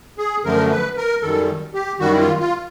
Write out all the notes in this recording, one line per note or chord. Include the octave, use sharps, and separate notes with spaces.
G#4
F#2 D3 F3 A3 A#4
B4
A#4
F#2 D#3 G3 A4
G4
F#2 D#3 G3 F#4
E4
F4
F4